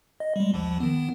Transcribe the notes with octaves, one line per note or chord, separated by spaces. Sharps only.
D#5
G3 G#3
A#1 D#2 F3
D#3 B3